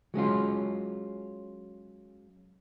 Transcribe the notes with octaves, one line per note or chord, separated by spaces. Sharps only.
F#3 G#3 C#4 F4